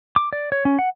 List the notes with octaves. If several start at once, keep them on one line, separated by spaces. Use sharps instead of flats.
D6
D5
C#5
C#4
F#5